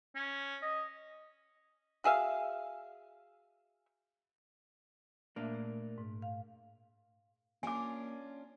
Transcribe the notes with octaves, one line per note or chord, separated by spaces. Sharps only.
C#4
D#5
F#4 G#4 E5 F5
A#2 A3 A#3 D4 E5
A3
G#2
F5
A#3 C#4 D4 F4 G#5 D6